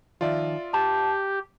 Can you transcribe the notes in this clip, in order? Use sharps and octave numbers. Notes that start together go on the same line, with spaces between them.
D#3 F3 F4 D5 E5
G4 A5